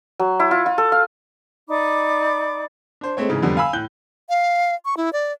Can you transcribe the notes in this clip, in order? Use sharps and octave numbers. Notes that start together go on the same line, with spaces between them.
F#3
E4
F4
F4
A4
F5
D#4 D5 B5 D6
D4 C5
G#3 A3 C4 C#5
G#2 C#3 E3
F2 D3 G3 B3
F5 G#5 B5 E6
A2 F#6 G6 G7
F5
C#6
E4
D5